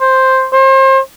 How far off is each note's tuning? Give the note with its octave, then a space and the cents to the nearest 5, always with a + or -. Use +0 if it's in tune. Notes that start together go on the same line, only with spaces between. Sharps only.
C5 +5
C5 +35